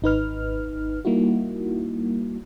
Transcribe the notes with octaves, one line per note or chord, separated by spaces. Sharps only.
G#1 D#4 B4 F6
G3 A#3 D#4 E4 F#4